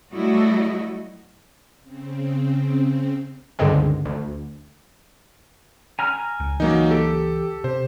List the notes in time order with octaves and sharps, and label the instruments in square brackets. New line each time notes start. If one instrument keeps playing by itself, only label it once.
[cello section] F#3 G3 A3 E4 F#4 D#5
[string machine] C#3 C4
[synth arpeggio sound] C#2 G2 D3 D#3 G#3 C4
D2
[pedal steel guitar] G#5 A#5 F6
[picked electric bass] C#2
[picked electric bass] C#2 E3 [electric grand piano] F#3 A#3 D#4
[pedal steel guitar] G4 [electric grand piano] A4
[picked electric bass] C3 [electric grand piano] C5